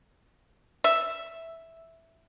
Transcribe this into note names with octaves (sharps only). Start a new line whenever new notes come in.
E5